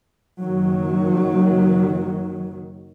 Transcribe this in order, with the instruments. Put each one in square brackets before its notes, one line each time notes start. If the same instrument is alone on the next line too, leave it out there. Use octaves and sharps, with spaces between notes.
[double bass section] F#1 D#3 F#3